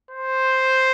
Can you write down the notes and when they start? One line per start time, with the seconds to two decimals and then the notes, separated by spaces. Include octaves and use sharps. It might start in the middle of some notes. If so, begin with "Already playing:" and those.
0.11 C5